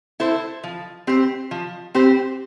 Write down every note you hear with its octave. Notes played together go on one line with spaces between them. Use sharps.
E4 A4 C5
F3
C4 G4 C5
F3
C4 G4 C5